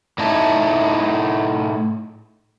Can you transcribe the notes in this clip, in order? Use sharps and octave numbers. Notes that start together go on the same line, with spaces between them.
A2 D#4 E4 A5